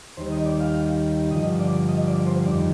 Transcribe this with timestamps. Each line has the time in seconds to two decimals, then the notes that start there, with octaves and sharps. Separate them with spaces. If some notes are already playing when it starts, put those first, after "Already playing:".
0.17 D#2 D#3 G3 C5
0.32 D#5
0.46 D5
0.60 F5
1.31 G2 D3 F3 D#5
1.60 D5
1.88 D#5
2.07 D5
2.26 C5
2.45 F2 D#3 G3 D5